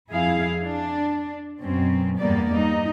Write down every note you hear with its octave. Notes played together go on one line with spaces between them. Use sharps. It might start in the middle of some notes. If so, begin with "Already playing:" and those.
F2 E4 G#4 F5
D4
F#2 B2 C4 C#4
E2 G2 G3 A#3 B3 D5
G3 D#4